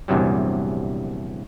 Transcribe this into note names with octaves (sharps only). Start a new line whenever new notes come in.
A#1 E2 G2 C3 F#3 G3